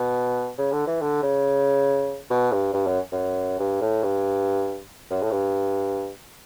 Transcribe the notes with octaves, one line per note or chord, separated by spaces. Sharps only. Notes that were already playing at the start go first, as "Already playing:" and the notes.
Already playing: B2
C#3
D3
E3
D3
C#3
B2
G2
G2
F#2
F#2
G2
A2
G2
F#2
A2
G2